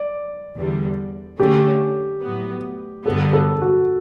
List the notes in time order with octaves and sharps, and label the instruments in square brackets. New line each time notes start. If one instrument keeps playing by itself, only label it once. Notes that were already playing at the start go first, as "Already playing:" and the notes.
Already playing: [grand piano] D5
[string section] E2 D3 G3
[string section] D3 A3 C#4 [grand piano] G4
[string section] A2 F#3 B3
[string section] G2 D3 G3 B3 [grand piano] A4
[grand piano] A4
F#4